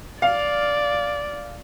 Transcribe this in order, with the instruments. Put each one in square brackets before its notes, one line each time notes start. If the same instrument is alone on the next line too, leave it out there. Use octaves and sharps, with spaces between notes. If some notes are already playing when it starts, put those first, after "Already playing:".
[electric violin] D5 [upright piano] F5